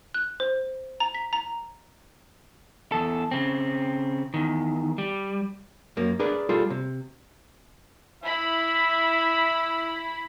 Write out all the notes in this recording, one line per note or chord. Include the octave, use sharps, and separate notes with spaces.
F#6
C5
A#5
B6
A#5
E2 A4
C#3 C4
E2 D#3
G3
F#2 A#3
D4 G#4 A#4 B4 D5
G3 F4 G#4 A4
C3
E4 E5 B5